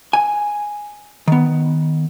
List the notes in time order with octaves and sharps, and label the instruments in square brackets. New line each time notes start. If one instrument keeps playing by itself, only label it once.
[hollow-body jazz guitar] G#5
D#3 B3